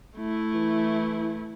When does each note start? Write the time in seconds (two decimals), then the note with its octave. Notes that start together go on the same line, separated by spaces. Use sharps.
0.17 A3 E4
0.54 E3